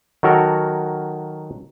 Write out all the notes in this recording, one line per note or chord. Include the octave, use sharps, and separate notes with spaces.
D#3 F#3 F#4 A4 A#4